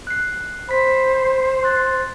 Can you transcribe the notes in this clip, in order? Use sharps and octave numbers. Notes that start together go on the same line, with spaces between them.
F#6 C7
C5 B5 B6
C6 F#6 A6